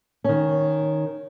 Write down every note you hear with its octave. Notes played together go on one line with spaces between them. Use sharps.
D#3 C#4